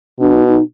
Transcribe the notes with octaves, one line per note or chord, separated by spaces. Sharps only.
B2 D4
D#4
D#4